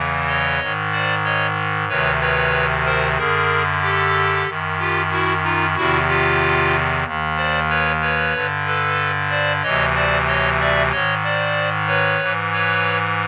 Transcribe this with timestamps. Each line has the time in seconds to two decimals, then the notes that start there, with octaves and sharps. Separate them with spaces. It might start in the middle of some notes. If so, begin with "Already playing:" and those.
Already playing: E2 C#3 E3
0.27 C#5 D#5
0.60 G#2 D#3
0.92 C5 D5
1.24 C#5 D#5
1.89 D2 C3 D#3 B4 C#5
2.21 B4 C#5
2.85 A#4 C5
3.17 F#2 D3 G#4 A#4
3.82 G4 A4
4.47 F#2 D#3
4.79 F4 G4
5.11 E4 F#4
5.43 D#4 F4
5.76 E2 C3 D#3 E4 F#4
6.08 F4 G4
7.04 D#2 D#3
7.37 C5 D5
7.69 B4 C#5
8.02 B4 C#5
8.33 G2 D3
8.66 A4 B4
9.30 C5 D5
9.63 D2 C3 E3 C#5 D#5
9.95 C5 D5
10.27 C#5 D#5
10.60 D5 E5
10.92 G#2 D#3 C#5 D#5
11.24 C5 D5
11.88 B4 C#5
12.21 G#2 E3
12.52 B4 C#5